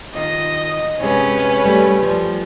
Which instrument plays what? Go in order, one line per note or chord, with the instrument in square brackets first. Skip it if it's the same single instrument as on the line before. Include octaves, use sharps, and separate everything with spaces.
[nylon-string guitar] D#3 F4 [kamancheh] D#5
[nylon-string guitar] C3 G#3 [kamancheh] C#4 B4
[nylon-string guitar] G3 A3
F3 G3